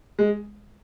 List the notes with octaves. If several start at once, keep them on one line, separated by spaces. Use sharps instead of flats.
G#3